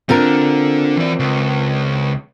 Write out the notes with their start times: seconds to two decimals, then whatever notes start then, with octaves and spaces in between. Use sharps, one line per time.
0.09 D3 C4 D4 F4 A#4
0.97 E3 D5
1.20 C#2